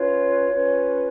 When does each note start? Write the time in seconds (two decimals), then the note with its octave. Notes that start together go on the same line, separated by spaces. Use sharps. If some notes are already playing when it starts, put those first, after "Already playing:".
Already playing: C#4 F4 B4 C#5
0.52 C#4 F4 B4